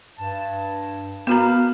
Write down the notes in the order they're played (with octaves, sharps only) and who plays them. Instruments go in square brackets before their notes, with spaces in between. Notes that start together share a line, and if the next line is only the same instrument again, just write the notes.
[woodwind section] G2 A5
[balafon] B3 F#4 A#5 [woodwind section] A#4 B4 F5